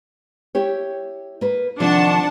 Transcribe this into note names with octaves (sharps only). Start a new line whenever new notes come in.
E4 G4 C#5
A#3 B4
C3 D#3 F3 D4 F#5 A5